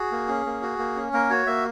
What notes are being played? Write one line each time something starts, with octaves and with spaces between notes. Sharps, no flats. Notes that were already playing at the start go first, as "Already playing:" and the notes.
Already playing: F#4 G#4
A#3
C#4
A#3
F#4
A#3
C#4
A#3 A#4
F#4 C#5
A#3 E5